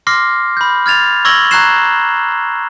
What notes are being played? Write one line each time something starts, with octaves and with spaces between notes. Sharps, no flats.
C6 D6 F6 A#6 C7
B5 G6
F6 G#6 A6 F7
C#6 E6 G#6 A#6 F#7 G7
A#5 C#6 F#6 G#6 C7 E7